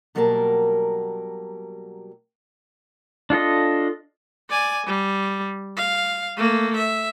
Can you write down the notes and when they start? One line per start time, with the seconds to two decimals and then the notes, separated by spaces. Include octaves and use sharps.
0.15 B2 F#3 G3 A#3 A#4 A5
3.30 D4 F4 A4 D#5
4.49 D5 G#5
4.86 G3
5.77 F5
6.36 A3 A#3
6.76 E5